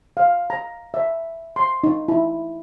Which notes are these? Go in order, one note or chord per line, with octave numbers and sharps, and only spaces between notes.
F5
A#5
E5
C6
D#4
E4